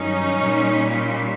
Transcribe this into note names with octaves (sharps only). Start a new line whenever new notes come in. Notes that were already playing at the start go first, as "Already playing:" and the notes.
Already playing: G2 D#3 F#3 C#4 D#4
A#2 G3